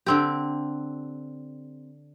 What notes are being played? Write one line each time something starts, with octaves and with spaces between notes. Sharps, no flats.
D3 C4 G4